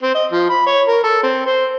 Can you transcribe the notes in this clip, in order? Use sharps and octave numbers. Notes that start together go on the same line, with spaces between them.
C4
D#5
F3
B5
C#5
A#4
A4
C4
C5